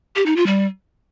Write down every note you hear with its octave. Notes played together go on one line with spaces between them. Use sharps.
G4
D#4
F4
G3